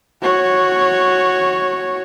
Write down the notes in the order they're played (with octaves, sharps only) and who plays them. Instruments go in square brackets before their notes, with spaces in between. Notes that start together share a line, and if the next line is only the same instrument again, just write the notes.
[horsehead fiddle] F#4 C#5